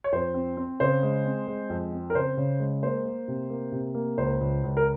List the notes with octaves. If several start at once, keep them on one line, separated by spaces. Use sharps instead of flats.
C#5
F2 C5
C4
C4
C#3 C5
G#3
C4
G#3
F2
C4
A#4
C#3 C5
C#3
G#3
A#3 C5
A#3
C3
A#3
C3
A#3
C#2 C5
C#2
C#2
A#4